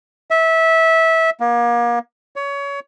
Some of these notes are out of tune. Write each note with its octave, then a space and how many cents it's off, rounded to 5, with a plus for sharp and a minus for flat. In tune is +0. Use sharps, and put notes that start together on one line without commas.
E5 -20
A#3 +35
C#5 +25